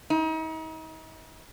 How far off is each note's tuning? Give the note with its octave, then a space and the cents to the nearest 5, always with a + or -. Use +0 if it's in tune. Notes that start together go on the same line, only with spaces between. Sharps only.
D#4 +40